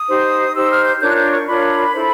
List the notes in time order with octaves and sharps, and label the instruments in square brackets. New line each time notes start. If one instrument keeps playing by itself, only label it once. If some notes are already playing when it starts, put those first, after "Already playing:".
Already playing: [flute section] D#6
D#4 G4 C5
D#4 G4 C5 E6
F6
G6
D4 F4 A#4 C#5 G6
F#6
G6
C#6
D4 F4 A#4 C#5 B5
E4 A4 C5